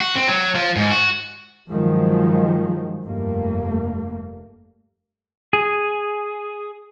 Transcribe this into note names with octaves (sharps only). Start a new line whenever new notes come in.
F#4
C4
F#3
F3
G#2
F#4
G2 D#3 F3 F#3 G#3
F1 G2 A3 A#3
G#4